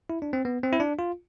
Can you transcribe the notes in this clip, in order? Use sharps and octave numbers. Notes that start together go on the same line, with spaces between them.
E4
D4
C4
B3
C4
E4
D4
F4